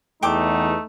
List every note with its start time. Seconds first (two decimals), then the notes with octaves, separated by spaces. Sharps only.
0.23 E2 A3 D#4 G5 D6